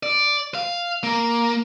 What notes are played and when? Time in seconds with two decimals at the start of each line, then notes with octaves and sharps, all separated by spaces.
0.03 D5
0.55 F5
1.03 A#3